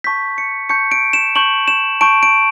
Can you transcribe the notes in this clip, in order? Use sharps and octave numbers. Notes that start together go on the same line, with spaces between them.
A5 C#6 G6 B6
C#7
A5 C#6 G6 C#7
D7
E7
A5 C#6 G6 F#7
E7
A5 C#6 G6 D7
D7